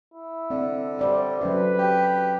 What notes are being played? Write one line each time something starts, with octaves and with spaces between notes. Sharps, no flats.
E4
D3 C4
G3 C5 D5 E5
C3 F#3 C#4 A4 B4
G4